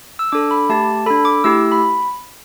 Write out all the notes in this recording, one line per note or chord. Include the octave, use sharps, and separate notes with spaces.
E6
D4 A4 D6
B5
A3 G4 A5
D4 A4 B5
D6
A3 E4 G4 E6
B5